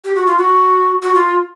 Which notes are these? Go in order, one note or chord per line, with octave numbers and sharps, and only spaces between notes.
G4
F#4
F4
F#4
F#4
F4